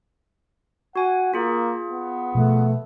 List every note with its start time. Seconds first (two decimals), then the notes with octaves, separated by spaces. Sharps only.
0.96 F#4 F#5 G#5
1.34 A#3 F4 G#4
1.90 B3
2.35 B2 F3 A3